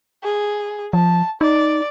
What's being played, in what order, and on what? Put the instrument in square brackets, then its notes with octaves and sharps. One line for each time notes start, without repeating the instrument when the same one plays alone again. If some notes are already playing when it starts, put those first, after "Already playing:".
[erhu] G#4
[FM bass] F3 [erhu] A5
[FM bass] D#4 [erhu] D5